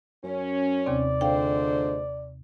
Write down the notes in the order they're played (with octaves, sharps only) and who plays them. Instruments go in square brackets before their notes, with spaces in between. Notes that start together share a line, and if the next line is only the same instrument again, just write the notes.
[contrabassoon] F#2 [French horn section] C#4
[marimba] D#2 C3 C4 [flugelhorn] D5
[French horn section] A#2 G#3 C5 [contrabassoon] D3 [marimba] F5 G5